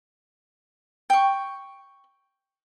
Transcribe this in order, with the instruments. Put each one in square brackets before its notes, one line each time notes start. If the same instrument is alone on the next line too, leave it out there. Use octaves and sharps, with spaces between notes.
[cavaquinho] G5 C#6